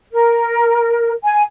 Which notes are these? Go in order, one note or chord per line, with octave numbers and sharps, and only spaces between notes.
A#4
G#5